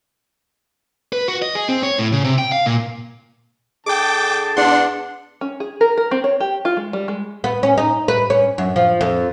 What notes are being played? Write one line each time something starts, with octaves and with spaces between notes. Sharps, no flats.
B4
F#4
D#5
G#4
C4
C#5
A2
C#3
C3
G5
F5
A#2
D3 G#4 G5 A5 D6
E2 D4 F#5 C6
C#4
G#4
A#4
A#4
C4
C#5
G4
F4
G#3
G3
G#3
B3
C#4
D#4
B4
C#4
F#2
F3
F2